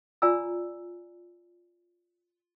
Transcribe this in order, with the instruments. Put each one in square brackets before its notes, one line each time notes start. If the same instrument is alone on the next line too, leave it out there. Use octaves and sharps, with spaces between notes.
[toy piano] F4 D5 G#5 A#5 E6